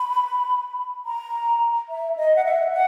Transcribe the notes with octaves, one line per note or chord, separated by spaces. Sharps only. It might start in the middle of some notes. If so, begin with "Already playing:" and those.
Already playing: B5
A#5
E5
D#5
F#5
E5
F#5